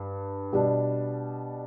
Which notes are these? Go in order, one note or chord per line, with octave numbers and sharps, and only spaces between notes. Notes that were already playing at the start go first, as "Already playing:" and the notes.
Already playing: G2
B2 G3 B3 D4